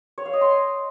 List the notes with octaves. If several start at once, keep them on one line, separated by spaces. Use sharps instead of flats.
C#5
F5
D#5
C6